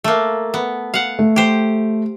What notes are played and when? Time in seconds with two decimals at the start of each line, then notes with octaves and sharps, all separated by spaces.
0.04 A3 A#3
0.54 B3
0.94 F5 F#5
1.19 A3
1.36 G4 C5